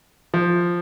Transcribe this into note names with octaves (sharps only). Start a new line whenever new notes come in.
F3